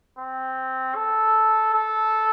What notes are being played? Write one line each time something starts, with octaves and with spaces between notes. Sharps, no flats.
C4
A4
A4